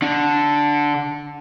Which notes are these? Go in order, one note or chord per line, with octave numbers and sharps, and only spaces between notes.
D3 D4